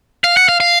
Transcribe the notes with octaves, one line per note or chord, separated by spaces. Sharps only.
F5
F#5
F5
F5